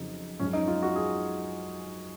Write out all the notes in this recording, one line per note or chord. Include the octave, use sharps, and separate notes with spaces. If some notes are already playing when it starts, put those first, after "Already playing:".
Already playing: F2 C#3 F#3 D#4
F#2 F3 G#3 C#4
D#4
F4
F#4
G#4